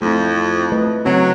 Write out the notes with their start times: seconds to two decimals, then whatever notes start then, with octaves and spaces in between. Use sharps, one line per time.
0.02 F2 A3 C4 E4
0.72 A3 B4 D#5
1.05 C#3 F#3 C4 F#4